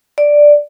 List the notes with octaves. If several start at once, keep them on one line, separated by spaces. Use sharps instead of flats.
D5